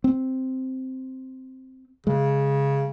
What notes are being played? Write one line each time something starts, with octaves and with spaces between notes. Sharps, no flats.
C4
C#3 G#3